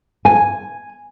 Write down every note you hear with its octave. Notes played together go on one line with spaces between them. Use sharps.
G#5